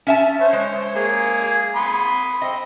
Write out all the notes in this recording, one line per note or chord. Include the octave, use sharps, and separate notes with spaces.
C#4 E5 A5
C5 C#5
G#3
A#3 G#4
B5 C6 D#6
C4 D#5